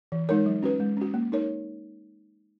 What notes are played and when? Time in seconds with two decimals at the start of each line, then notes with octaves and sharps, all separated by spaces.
0.12 E3
0.29 G#3 D#4 A#4 C#5
0.46 F#3
0.63 C#4 F#4 B4
0.80 G#3
0.97 C#4 F#4
1.14 A#3
1.32 D#4 A#4 C#5